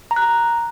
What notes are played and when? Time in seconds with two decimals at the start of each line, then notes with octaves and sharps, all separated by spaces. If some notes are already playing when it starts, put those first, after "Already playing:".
0.11 A#5
0.16 F#6
0.22 A#5